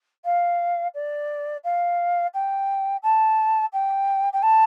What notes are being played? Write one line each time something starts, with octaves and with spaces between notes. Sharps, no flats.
F5
D5
F5
G5
A5
G5
G5
A5